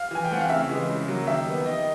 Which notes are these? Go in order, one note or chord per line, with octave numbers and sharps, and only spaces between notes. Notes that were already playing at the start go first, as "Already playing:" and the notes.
Already playing: F5
E3 G#5
G5
A3 C4 F#5
F5
C#3 E5
E3 G#3
C#3
F#3 A#3
D#3 E5
G3 B3
D#3 D#5